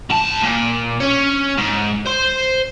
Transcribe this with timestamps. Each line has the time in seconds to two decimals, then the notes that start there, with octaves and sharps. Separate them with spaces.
0.10 G#2 A5
0.43 A#2
1.00 C#4
1.58 G#2
2.06 C5 C6